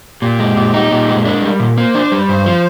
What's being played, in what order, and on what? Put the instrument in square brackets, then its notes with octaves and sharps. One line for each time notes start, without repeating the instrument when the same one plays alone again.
[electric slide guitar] A#2 [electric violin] G4
[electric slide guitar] G#3
A#2
D#4
A#2
G#3
[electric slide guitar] D4 [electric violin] A#4
[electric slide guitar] G3
A#2
[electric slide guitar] A#3 [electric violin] C5
[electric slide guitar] D4
G3
[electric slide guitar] G2 [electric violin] C5
[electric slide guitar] F3